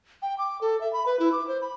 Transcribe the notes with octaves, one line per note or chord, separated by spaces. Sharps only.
G5
D6
A4
E5
B5
B4
E4
D6
C5
B5